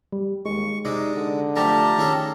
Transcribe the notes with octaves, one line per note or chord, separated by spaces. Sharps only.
G3
D#2 G#3 C#6
C3 G#3 D#4 D5 D#5
D3
F3 G3 A3 G4 A5 A#5
D#3 C#4 G#4 A4